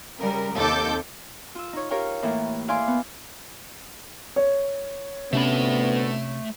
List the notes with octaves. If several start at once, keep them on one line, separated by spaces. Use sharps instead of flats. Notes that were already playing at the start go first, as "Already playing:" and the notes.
C#3 G3 A#4
D#2 C3 A4 D6 G6
F4 E6
D#4 C#5
G4 A#4 C#5 F5 G5
A2 E3 A#3 A4 A#5
E4 D5 F5 G#5 C6 D6
B3
C#5
D2 C3 A3 B3 C#4 B5